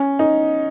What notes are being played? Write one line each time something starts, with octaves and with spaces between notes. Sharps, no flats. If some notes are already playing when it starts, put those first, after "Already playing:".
Already playing: C#4
D#4